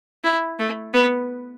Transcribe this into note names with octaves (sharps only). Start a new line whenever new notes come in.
E4
A3
B3